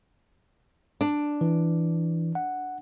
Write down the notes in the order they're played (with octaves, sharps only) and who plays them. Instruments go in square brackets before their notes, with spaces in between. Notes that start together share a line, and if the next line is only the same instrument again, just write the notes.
[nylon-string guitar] D4
[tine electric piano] E3
F#5